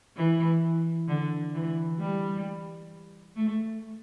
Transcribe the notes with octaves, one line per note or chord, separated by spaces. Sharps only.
E3
D3
E3
G3
A3